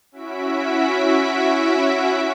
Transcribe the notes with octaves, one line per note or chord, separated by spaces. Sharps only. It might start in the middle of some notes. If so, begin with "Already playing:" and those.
C#4 E4 F#4 E5 B6 D7